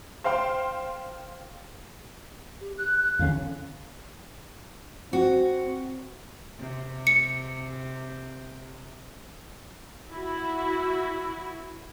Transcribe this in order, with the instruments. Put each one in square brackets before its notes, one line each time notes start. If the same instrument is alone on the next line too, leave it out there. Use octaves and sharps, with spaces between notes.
[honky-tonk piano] C5 F5 G5 C6
[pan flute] G4
F#6
F#6
[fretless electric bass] E2 D3 C#4 [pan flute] F5
[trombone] C4 [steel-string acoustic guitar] F#4
[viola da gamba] C3
[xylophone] C#7
[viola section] E4 F#4